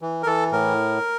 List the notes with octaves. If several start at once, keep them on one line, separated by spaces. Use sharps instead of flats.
E3
A#4
E3 A4
A2 A#4